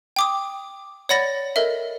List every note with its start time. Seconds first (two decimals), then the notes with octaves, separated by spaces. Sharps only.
0.16 G5 D6 D#6
1.09 C#5 D5 F#5 B5 A6 A#6
1.56 A4 A#4 D#5 E5